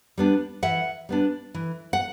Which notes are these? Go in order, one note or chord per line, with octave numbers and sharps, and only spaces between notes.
G3 B3 D4
E3 E5 F#5
G3 B3 D4
E3
F#5